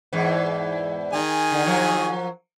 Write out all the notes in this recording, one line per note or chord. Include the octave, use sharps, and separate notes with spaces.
E2 G#2 E3
D#3 G#4 G#5
D3
F3 F#3 A#4